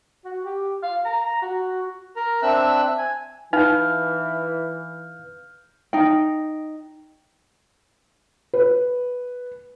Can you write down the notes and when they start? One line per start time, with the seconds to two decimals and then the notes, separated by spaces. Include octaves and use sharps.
0.25 F#4
0.44 G4
0.83 F5
1.05 A#5
1.42 F#4
2.16 A#4 A#5
2.43 C4 D4 E5 E6 F#6
2.98 G#5
3.53 E3 D#4 B4 F5 F6 G6
5.93 D#4 G5
8.53 B4